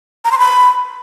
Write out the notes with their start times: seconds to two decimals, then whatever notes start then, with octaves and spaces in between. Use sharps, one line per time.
0.25 A#5
0.32 C6
0.39 B5